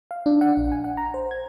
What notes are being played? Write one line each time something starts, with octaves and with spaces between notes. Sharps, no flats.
F5
D4
F#5
A#1
G#5
F#5
A#5
C5
G#6